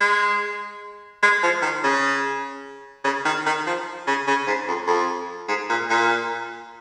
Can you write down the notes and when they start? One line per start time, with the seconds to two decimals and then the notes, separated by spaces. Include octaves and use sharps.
0.01 G#3
1.23 G#3
1.43 F3
1.62 D#3
1.84 C#3
3.04 C#3
3.25 D#3
3.46 D#3
3.67 F3
4.07 C#3
4.27 C#3
4.47 G#2
4.68 F2
4.88 F2
5.48 G#2
5.69 A#2
5.90 A#2